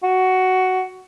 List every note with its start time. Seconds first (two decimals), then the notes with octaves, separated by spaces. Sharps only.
0.03 F#4